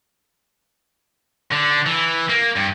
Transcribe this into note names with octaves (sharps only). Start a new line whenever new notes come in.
D3
E3
A#3
G2